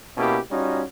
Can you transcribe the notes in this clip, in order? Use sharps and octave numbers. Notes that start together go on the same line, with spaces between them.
B2 A#3 C#4 E4 G4
G3 C#4 D#4 F4 F#4